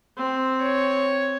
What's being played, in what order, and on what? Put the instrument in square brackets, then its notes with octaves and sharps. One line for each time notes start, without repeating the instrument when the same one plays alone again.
[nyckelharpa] C4
[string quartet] C#5